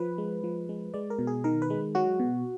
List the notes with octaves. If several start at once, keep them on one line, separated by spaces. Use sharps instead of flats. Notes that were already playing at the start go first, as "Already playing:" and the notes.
Already playing: F3 B4
G#3
F3
G#3
G#3 D5
A#4
B2
G#4
D#3 A#4
B4
G#3
F#3 F#4
B2